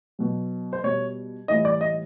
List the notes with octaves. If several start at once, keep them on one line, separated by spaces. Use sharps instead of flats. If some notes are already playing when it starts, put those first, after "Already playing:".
B2 F#3
C5
B2 G3 C#5
A2 E3 G3 D#5
D5
D#5